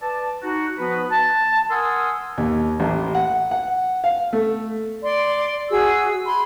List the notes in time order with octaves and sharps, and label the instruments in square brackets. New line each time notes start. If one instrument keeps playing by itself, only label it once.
[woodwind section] B4 D5 A5
D#4 F#4
F3 B3 F#4 B4
A5
A#4 F#5 G#5 C6 D#6 E6
[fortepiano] D#2
A1
F#5
F#5
F5
A3
[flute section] D5 C6
F#4 G#4 E6
B5 C6